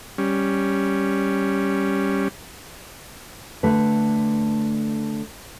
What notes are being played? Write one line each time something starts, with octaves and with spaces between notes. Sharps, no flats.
G3 C#4
D3 A3 B4